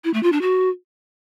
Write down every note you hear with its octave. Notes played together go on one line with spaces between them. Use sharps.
E4
A3
F4
D4
F#4